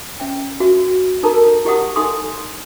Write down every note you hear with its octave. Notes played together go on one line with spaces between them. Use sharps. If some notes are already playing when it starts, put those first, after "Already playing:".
C#4 C#5 E5 G5
F#4 E5
D#4 A4 A#4 A5 A#5
E4 G4 D#5 F#5 D#6
D#4 A4 E5 G#5 C6 D#6